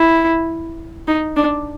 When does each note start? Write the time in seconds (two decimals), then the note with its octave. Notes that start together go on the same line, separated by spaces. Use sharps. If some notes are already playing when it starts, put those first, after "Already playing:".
Already playing: E4
1.07 D#4
1.36 D4